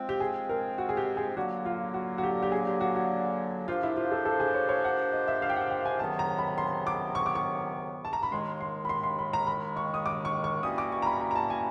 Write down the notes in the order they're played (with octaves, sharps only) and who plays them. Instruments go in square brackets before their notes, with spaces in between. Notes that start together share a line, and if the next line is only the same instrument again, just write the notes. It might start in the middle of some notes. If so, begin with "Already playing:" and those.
Already playing: [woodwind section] F3 G#3 C4
[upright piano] G4
G#4
A#4
F#4
G#4
G4
G#4
[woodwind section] D3 F#3 A#3 [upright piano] F#4
[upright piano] F4
F#4
F#4
G4
G4
G#4
G4
F#4
F#4
[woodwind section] F3 A#3 D4 G4 C5 [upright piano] F4
[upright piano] E4
F4
A4
A4
G#4
C#5
C#5
F#5
D#5
E5
F5
G5
F#5
G5
G#5
[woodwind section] C#2 C3 D#3 F#3 B3 [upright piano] A5
[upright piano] A#5
B5
C6
D6
C#6
D6
C#6
A5
A#5
B5
[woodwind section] D#2 D#3 G#3 [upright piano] C6
[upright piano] C6
B5
C6
C6
B5
A#5
B5
C#6
D#6
D6
C#6
C#6
[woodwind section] E3 G3 A#3 C#4 F#4 [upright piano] D#6
[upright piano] D6
C#6
A#5
B5
A#5
A#5
A5
G#5